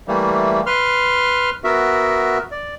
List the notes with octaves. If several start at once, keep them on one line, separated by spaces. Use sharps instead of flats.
E3 G3 A3 A#3
B4 C6 F6
B3 F#4 A#4 E5
D5